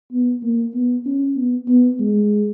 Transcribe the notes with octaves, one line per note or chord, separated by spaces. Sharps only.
B3
A#3
B3
C#4
B3
B3
G#3